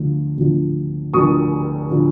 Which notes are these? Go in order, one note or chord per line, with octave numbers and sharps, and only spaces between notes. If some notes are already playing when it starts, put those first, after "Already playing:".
Already playing: D2 D3 F3
D2 D3 F3
D2 D3 F3 C#6 D#6
D3 F3